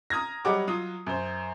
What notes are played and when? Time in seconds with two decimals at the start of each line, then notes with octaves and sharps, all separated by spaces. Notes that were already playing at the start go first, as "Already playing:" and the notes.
0.10 A#5 D#6 F6 G#6 A#6
0.45 F#3 G3 C#5 D#5 F#5 D6
0.67 F#3 F4 D#6
1.07 F#2 C5